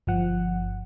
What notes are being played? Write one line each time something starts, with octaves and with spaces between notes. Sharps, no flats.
G1 F3 F#5